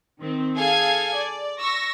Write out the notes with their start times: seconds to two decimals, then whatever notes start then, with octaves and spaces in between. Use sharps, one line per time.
0.19 D#3 C4
0.57 G#4 A4 F5 G#5 G#6
1.16 D5
1.61 C#6 E6 A#6